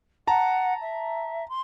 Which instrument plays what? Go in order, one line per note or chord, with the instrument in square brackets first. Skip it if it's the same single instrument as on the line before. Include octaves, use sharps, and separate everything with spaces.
[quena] F#5 [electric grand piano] A5 A#5
[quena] E5
C6